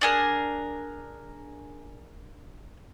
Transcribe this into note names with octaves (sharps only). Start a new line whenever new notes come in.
D4 G#4 A#4